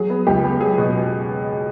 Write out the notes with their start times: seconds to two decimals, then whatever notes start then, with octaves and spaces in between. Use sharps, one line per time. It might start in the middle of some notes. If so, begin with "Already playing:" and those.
Already playing: F#3 G#4
0.10 B3
0.27 C#2 G4
0.43 B3
0.61 F#3 G#4
0.78 B2